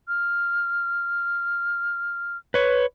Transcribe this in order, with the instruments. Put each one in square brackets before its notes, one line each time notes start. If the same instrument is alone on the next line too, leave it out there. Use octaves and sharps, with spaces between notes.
[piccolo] F6
[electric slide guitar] B4 C#5